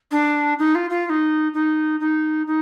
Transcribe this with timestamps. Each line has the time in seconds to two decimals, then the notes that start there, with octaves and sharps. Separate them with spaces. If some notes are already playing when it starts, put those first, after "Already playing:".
0.11 D4
0.58 D#4
0.75 F4
0.90 F4
1.05 F4
1.09 D#4
1.53 D#4
2.00 D#4
2.47 D#4